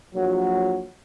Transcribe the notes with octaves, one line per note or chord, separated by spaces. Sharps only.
A#1 A#2 F#3